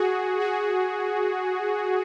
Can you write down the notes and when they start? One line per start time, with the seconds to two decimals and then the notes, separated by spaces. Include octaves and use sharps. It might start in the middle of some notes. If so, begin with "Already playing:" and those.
Already playing: F#4 G#4
0.40 F#4 G#4